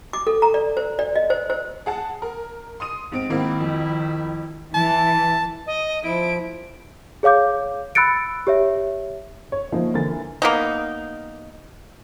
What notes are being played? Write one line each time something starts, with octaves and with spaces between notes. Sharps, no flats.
D6
A4
A#5
D5
C5
D5
D#5
C5
C5
G#4 F#5 A5
A#4
C6 D#6 D#7
G#2 C4 D7
G#2 D#3 A#3 C4 E4
F2
E3 A5
D#5
F3 E4 D7
G#4 C#5 F5 D6 G6
B5 E6 F#6 A6 C#7 D7
G4 C#5 E5
C#5
F3 A#3 D#4 E4
D3 E3 A#4 A6
A#3 B3 D#4